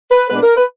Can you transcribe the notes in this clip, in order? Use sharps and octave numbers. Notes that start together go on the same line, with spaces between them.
B4
A#2 G#3 B3 D4 B4
A#4
B4